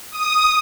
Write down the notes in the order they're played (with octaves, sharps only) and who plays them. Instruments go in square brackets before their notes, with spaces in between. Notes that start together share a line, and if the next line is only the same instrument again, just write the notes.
[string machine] D#6